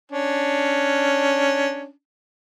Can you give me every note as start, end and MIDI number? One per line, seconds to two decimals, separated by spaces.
0.12 1.90 61
0.12 1.90 62